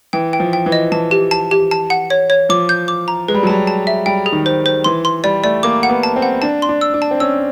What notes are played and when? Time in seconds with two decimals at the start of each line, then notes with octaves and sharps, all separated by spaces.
0.13 E3 G5
0.33 G5
0.40 F3
0.53 G5
0.66 E3
0.72 D#5
0.92 E3 A5
1.11 G4
1.31 A5
1.51 G4
1.71 A5
1.90 F#5
2.10 C#5
2.30 C#5
2.49 F3 D6
2.69 G6
2.88 D6
3.08 A#5
3.28 G#3 B4
3.35 G3
3.43 F#3
3.47 G3 A5
3.67 A5
3.87 E5
4.06 G3 G5
4.26 G#4
4.32 D#3
4.46 C5
4.66 C5
4.84 E3 C6
5.05 C6
5.24 G3 D5
5.44 A3 D5
5.63 A#3 D6
5.83 F#5
5.89 B3
6.03 A5
6.16 C4
6.22 F#5
6.42 D4 A5
6.62 C6
6.69 D4
6.81 E6
6.94 D4
7.02 A5
7.11 C4
7.20 C#4 E6